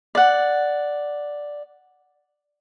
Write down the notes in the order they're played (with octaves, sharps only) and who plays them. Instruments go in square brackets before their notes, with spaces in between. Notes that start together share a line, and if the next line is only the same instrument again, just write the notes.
[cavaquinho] D5 F#5